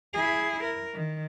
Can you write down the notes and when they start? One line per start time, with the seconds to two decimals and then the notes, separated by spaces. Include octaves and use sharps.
0.14 E4 G#4
0.63 A#4
0.94 D#3